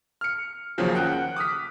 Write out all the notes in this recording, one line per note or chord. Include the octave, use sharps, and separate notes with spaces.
F6 C#7
D#2 C#3 F3 F#3
F#5 G5 F#6
D6 D#6 F6 B6